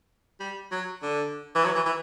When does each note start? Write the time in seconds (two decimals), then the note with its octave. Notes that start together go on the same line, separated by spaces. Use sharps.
0.40 G3
0.71 F#3
1.02 D3
1.55 E3
1.65 F#3
1.75 E3
1.86 E3